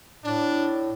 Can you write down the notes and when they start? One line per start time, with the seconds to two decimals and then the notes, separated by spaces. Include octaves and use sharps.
0.23 A2 D4